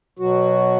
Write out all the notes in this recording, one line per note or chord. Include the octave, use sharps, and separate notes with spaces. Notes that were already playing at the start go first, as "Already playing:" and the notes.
B2 F#3 F#4